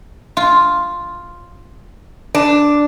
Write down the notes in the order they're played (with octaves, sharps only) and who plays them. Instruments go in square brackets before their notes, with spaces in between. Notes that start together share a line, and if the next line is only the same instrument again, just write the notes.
[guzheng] F4
[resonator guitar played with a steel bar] D4